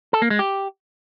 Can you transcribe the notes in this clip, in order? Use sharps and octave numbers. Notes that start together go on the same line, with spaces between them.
A4
A#3
G#3
G4